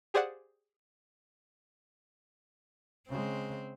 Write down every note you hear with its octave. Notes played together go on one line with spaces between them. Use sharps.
G4 G#4 C5 D5 F5 F#5
C#3 G#3 C4